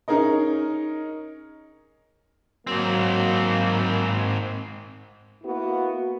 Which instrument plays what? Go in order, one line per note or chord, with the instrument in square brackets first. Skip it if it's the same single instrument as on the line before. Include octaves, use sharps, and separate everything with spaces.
[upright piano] C#4 D#4 G#4 A#4 D#5
[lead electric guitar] G#2 C4 [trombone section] F#3 A#3
[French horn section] A#3 B3 E4 F#4